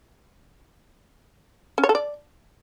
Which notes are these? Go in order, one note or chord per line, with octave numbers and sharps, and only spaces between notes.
C#4
C#5
A4
D5